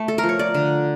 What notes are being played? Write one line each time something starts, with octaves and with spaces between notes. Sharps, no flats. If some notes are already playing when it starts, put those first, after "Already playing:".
Already playing: A3
A4
A#4
F3
C#5
D5
D3